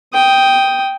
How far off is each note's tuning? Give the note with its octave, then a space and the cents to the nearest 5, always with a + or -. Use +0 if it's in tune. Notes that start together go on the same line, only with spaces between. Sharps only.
G5 +0 D#6 +5